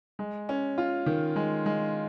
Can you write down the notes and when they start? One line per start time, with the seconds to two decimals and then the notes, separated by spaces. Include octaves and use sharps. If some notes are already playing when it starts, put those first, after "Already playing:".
0.19 G#3
0.49 C#4
0.78 F4
1.06 D#3
1.36 G#3
1.66 G#3